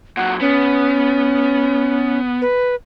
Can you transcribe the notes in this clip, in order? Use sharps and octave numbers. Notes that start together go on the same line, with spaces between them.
A#2 F#3 F#5
B3 C#4
B4